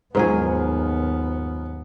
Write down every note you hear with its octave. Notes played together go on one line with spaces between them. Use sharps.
D#2 G#2 F3 F#3 B3 G#4 A#4 C5